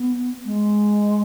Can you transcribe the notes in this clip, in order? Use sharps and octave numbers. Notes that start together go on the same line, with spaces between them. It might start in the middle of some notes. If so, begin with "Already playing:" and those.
Already playing: B3
G#3